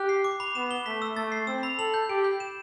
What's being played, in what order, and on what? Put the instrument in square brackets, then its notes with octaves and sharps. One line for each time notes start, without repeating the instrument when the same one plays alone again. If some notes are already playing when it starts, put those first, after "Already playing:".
Already playing: [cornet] G4 [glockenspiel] F#6
[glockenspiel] C7
D6
B5
[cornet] B3 [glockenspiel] E7
[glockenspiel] G7
[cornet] A3 [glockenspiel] B6
[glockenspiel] E6
[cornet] A3 [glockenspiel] A6
[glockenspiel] C7
[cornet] C4 [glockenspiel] E6
[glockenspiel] B5
[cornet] A4 [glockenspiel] F#7
[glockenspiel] G6
[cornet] G4 [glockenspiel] D7
[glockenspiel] G6
E7